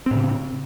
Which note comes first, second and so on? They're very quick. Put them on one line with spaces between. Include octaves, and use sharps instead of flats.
C4 A2 C#3